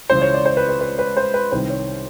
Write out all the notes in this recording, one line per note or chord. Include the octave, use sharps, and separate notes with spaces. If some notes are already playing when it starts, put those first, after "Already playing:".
C#2 C#3 E3 G#3 C5
C#5
D5
C5
B4
B4
B4
B4
C5
B4
C2 C3 D#3 C5
C#5